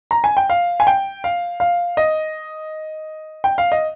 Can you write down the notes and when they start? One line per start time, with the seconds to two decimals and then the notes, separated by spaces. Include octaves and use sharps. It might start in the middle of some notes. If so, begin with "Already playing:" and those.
0.11 A#5
0.24 G#5
0.37 G5
0.50 F5
0.80 G#5
0.87 G5
1.24 F5
1.60 F5
1.97 D#5
3.44 G5
3.58 F5
3.72 D#5